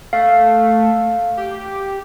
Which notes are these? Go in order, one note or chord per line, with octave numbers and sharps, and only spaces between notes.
A3 F5
G4